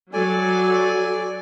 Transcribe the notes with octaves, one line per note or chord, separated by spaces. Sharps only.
F#3 A4 D5 G#5